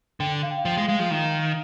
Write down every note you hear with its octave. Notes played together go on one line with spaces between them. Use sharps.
D3 G5
F5
G5
F5
F3 G5
G#3
G#3 F5
F3
D#3 F5